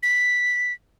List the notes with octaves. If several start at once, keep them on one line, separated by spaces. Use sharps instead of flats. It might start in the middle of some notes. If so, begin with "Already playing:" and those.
B6